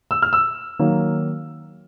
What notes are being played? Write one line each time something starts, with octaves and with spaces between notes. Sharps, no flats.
E6
F6
E6
D#3 F#3 A#3